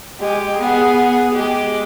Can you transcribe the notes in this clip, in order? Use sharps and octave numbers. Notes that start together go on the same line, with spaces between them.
G#3 G4
B3 G#4
G#3 G4